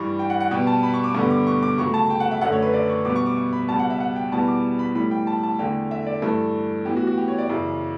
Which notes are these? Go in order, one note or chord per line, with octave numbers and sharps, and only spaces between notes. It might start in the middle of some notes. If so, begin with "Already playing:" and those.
Already playing: G2 E3 G3 C#6
G5
F#5
F#5
B2 G3 B3 G5
A5
B5
C#6
D6
G2 D3 G3 B3 C#6
D6
C#6
D6
C#2 C#3 F#3 A3 C#6
A5
G5
F#5
E5
F#2 D3 A3 F#5
C#5
B4
D5
C#6
B2 G3 B3 D6
C#6
D6
C#6
B5
C#2 B2 G3 A5
F#5
E5
F#5
G5
E2 B2 G3 B3 A5
D6
B5
A2 E3 G3 B5
G5
A5
A5
E2 D3 A3 G5
E5
D5
G2 E3 A3 A4
A2 E3 B3 G4
F#4
F#4
G4
C#5
D5
F#2 C#3 E3